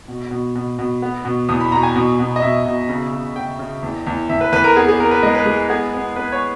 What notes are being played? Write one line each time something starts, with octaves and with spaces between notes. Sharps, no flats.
B2
B2
B2
B2
B3
B2
E2 D#6
B5
B2 A#5
G#5
B2
B2
D#5
B2 E5
B2
C#3
C#3
C#3 G5
C#3
E2
E2
E2 E5
B4
E2 B4
A#4
B3 G#4
G#4
B3 A#4
B4
G#3 D#5
B4
G#3 G#4
B3 G#4
B3
B3 B4
C#5